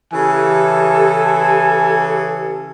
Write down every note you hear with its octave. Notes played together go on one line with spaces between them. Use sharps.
C#3 E3 G4 A4 G#5